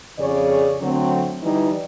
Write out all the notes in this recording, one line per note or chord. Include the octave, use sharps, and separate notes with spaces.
F2 C#3 G#4 C#5 D5
D3 F#3 A3 C4
D3 E3 G3 D#4 E4